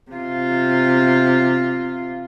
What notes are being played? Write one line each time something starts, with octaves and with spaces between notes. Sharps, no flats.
C3 F4